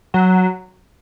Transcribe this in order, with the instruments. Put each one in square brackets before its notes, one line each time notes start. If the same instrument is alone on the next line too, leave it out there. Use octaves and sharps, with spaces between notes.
[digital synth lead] F#3